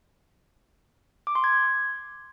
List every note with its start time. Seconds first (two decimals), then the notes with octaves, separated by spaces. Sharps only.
1.27 D6
1.35 C6
1.44 G#6